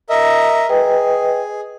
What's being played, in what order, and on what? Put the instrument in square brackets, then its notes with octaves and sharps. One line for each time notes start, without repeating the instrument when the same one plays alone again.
[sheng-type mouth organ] A#4 D#5 E5
[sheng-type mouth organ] G#4 [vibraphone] B4 D#5 G5